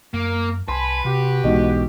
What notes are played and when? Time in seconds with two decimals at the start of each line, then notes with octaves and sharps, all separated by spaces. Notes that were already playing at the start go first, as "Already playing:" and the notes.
0.14 F#2 A#3
0.68 C2 B4 G#5 A5 B5 C6
1.05 C3 F#4 G4
1.44 B1 G#2 B2 E3